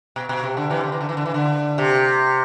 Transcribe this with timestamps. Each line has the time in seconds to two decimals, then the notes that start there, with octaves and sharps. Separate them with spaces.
0.16 B2
0.29 B2
0.44 C3
0.57 D3
0.70 C3 E3
0.84 D3
0.92 E3
1.01 D3
1.09 E3
1.17 D3
1.26 E3
1.34 D3
1.78 C3